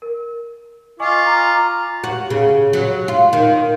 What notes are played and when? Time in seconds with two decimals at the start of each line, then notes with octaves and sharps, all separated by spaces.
0.02 A#4
1.00 F4 D#5 G#5 C#6 D6
1.26 A#5
2.04 F#4
2.30 C#3
2.73 F#3
3.08 F4
3.33 D#3